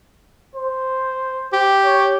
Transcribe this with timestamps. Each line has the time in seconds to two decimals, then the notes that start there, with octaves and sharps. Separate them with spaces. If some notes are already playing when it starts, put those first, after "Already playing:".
0.55 C5
1.53 G4
1.85 C#5